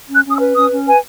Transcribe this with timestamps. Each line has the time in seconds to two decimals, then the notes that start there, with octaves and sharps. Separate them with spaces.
0.09 C#4
0.14 F#6
0.25 C#4 D#6
0.36 E6
0.40 B4
0.55 C#4 D#6
0.71 C#4
0.87 B4 G#5